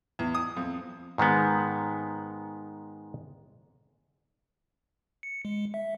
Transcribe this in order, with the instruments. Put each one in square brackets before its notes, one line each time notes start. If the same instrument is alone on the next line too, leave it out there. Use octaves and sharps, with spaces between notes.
[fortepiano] E2
D#6
F2
[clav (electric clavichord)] G#2 D#3 G#3 B3
[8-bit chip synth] C#7
G#3
E5